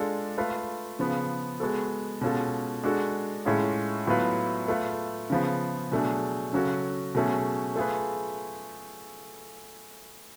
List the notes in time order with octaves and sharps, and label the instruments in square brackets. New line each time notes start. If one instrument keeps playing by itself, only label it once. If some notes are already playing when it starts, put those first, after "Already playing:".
Already playing: [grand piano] G#3 D4 F4 A4
A3 F4 B4
C#3 F3 B3
G#3 B3 F#4 A4
B2 G#3 C#4 F4 A4
G#3 D4 F#4 A4
A2 G#3 C#4 F4
A2 F#3 B3 F4 B4
A3 F4 B4
C#3 F3 B3
B2 F#3 A3 D4 G#4
C#3 F#3 C#4 F#4 A4
B2 F#3 A3 C#4 G#4
A3 F4 G#4 B4